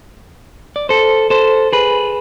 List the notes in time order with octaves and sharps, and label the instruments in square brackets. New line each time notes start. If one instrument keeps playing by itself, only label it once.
[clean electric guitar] D5
A4 C5
A4 C5
G#4 B4